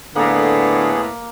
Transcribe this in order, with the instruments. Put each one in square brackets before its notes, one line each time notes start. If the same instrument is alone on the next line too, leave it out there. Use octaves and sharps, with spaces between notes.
[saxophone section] A2 B3 [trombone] D3 [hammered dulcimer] A#3 [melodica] G#4